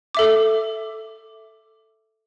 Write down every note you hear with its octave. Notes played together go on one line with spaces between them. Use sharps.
A4 E5 D6